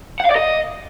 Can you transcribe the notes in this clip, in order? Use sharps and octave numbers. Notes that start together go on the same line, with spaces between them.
F#5
F5
D5
D#5